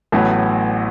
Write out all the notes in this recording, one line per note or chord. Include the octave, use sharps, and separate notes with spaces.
A1 A2 F#3 B3